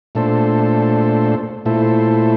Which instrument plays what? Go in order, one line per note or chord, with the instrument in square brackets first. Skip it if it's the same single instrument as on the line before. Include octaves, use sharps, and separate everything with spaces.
[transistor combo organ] A#2 A3 D4 A4 C5
A#2 A3 E4 A4 C5